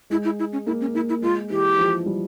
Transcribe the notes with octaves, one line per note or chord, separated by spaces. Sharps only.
G#3 E4
E4
E4
C#4
A#3 E4
C#4
A#3 E4
E4
G#3 F4
E3 G4
F3
G3